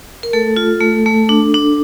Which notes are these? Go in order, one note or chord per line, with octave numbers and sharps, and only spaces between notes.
A#4
A3 A4
F4
A3
A3
D4
D4